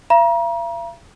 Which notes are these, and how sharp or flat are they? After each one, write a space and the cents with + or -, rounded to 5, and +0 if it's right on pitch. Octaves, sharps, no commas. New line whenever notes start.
F5 -45 A#5 +35